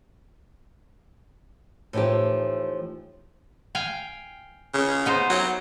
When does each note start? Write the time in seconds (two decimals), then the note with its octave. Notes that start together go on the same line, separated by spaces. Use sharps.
1.93 A2 E3 F3 D#4 G4
3.75 F5 G5 G#5
4.74 C#3
5.06 B3 D#4 C5
5.30 F#3